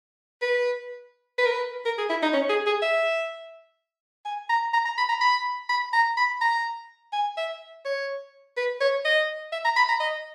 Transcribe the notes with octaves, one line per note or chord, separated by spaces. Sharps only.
B4
B4
A#4
B4
A#4
G#4
E4
D#4
C#4
G#4
G#4
E5
G#5
A#5
A#5
A#5
B5
A#5
B5
B5
A#5
B5
A#5
G#5
E5
C#5
B4
C#5
D#5
E5
A#5
B5
A#5
D#5